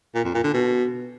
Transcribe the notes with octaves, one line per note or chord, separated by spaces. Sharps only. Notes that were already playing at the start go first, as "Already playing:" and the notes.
A#2
F2
A#2
D3
B2